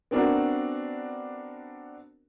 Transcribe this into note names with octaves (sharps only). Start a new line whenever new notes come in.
B3 C4 D4 F#4 A#4